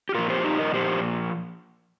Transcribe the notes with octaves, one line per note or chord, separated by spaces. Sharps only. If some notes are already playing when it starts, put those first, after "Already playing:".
G4
A#2 F3 F4 A#4
G4 C5
D#4 G4
A#4 D#5
A#2 F3 G4 C5